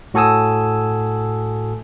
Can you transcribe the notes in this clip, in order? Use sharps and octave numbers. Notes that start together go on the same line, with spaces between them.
A2 F#4 A4 G#5 D#6 E6